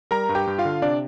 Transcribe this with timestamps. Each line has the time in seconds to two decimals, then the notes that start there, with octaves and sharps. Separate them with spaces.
0.11 G3 A#4 A#5
0.29 G2
0.35 G4 G5
0.47 G2
0.58 F4 F5
0.65 D3
0.82 C3 D4 D5